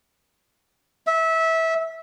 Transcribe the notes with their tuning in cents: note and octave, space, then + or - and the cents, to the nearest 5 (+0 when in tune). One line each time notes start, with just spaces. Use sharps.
E5 -20